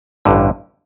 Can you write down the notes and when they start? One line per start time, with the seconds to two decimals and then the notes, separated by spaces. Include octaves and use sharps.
0.25 A1 G2 D3